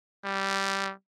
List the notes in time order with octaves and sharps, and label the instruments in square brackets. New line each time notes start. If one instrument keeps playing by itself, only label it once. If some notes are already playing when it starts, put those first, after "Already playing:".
[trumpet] G3